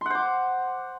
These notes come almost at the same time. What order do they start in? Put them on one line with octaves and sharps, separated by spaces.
C6 F#5 C5 D6